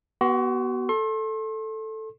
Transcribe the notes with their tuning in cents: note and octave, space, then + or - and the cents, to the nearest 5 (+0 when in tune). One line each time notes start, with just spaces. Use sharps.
B3 -20 F#4 +35 C6 +15
A4 +0 C6 +40